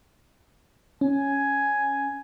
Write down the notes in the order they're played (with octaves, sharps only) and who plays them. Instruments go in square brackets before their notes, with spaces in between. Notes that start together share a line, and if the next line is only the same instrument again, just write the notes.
[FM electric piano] C#4 [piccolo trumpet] G#5